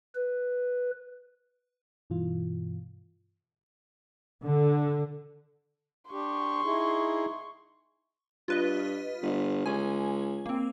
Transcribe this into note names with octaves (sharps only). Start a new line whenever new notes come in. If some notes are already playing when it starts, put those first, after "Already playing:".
B4
G2 B2 E3 F4
D3
D4 G4 C6 C#6
D#4 E4 G#4
G2 F4 B4 D#5
G1
C#2 G#5
A#3 C4